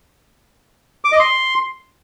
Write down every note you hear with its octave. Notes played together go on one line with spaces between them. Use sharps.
D6
D#5
C6